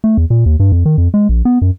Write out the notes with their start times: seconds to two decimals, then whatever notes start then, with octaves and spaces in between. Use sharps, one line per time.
0.04 A3
0.17 E2
0.30 A#2
0.46 D#2
0.60 G2
0.72 F2
0.85 D#3
0.98 F2
1.14 G#3
1.29 A#1
1.45 B3
1.62 F#2